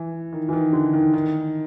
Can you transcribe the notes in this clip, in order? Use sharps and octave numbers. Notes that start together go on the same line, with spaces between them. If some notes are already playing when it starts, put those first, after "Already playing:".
Already playing: E3
D#3
E3
D#3
D3
D#3
D#3